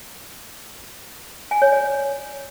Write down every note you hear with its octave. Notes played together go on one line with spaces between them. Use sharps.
G#5
C#5
D5